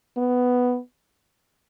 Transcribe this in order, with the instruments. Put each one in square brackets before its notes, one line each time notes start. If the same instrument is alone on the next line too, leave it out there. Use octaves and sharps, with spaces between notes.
[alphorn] B3